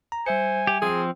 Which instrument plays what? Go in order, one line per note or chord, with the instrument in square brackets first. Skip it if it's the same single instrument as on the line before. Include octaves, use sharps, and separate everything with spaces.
[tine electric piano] A#5
[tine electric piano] G3 E5 C#7 [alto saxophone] C5 [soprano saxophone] G#5
[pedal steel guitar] G4
[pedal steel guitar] F3 C4 [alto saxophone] G#4